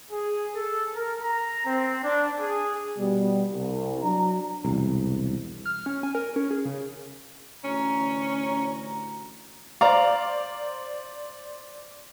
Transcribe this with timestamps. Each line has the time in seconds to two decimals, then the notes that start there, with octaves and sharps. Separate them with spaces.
0.11 G#4
0.55 A4
0.94 A#4
1.22 A#5
1.66 C4
2.03 D4
2.40 G#4
2.98 B2 G3
3.51 C2
4.02 F#3 D4 A#5
4.65 E1 C2
5.66 F6
5.86 C#4
6.03 G#5
6.15 A#4
6.36 C#4
6.51 G#4
6.65 C#3
7.64 A1 D2 C#4 A#5
9.81 C5 D5 F5 A#5